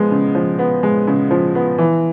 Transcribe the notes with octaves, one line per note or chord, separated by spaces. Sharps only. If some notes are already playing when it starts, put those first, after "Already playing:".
Already playing: F3 G#3 B3
C#3
F3
B3
G#3
C#3
F3
B3
E3